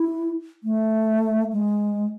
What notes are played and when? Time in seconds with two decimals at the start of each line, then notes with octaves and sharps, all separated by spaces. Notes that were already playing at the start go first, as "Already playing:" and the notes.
Already playing: E4
0.64 A3
1.53 G#3